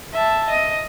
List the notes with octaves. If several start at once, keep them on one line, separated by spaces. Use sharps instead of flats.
E5 A5
D#5